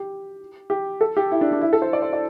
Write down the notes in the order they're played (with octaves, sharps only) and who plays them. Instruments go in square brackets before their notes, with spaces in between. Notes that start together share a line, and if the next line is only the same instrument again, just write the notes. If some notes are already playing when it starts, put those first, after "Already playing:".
Already playing: [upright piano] G4
G4
A4
G4
E4
D4
D4
E4
A4
C5
D5
C5
D5